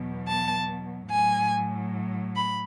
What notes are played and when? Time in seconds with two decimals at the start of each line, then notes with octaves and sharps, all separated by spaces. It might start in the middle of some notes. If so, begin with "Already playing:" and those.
Already playing: E2 B2 F#3
0.27 A5
1.10 A2 F#3 G#5
2.36 B5